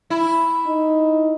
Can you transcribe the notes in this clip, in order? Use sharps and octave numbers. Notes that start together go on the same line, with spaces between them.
E4
D#4